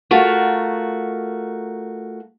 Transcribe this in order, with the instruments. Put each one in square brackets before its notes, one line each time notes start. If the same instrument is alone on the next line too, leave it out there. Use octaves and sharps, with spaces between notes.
[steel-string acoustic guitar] A3 F4 F#4 A#4